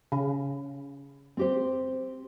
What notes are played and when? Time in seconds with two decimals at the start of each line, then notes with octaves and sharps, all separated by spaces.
0.12 C#3
1.37 C4 G4 C5